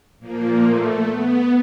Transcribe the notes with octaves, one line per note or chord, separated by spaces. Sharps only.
A#2 F3 A#3
A3
B3